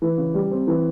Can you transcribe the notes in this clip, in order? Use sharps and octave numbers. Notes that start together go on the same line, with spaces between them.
E3
C#3
G3
C4
E3